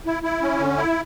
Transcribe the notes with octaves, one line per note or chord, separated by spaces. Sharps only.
E4
E4
C#4
D3
E4